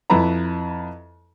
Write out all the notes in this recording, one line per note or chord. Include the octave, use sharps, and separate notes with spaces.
F2 E4 B4 A#5 B5